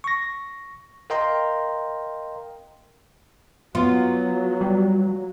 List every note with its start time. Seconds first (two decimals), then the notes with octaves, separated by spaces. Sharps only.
0.04 C#6 A#6
1.10 A#4 D#5 F5 G5 A#5 C6
3.75 F#3 B3 F4
4.61 G3